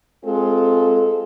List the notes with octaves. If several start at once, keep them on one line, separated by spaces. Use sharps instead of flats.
G#3 C4 F4 G#4 A4